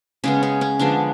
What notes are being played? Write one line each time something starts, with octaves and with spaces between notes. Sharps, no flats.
C#3 G#3 B3 C#4
C#4
C#4
D3 F3 G#3 B3 D4